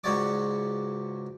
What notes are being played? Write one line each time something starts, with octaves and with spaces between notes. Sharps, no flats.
C#2 G#2 F#4 C#5 D5 D6